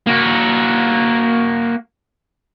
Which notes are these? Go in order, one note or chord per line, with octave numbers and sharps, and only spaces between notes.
A#3 F#4